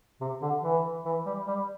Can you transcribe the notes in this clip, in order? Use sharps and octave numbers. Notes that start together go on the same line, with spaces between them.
C3
D3
E3
E3
G3
G3